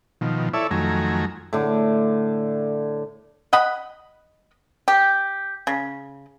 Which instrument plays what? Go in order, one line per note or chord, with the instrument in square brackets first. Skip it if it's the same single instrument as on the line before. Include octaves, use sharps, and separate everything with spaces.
[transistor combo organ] B2 D#3 F3
E4 A4 C#5 D5 E5
F2 D#3 F#3 A3 G#5 A#5
[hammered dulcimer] A2 D3
[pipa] D#5 F#5 B5
G4
C#3